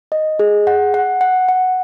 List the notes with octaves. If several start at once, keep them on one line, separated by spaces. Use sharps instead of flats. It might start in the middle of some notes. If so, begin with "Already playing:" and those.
D#5
G#4
F#5
F#5
F#5
F#5